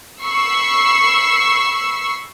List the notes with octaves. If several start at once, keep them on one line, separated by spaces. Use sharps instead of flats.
B5 C#6 E6 C7